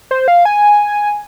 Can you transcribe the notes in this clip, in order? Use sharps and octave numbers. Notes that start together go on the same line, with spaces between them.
C5
F5
G#5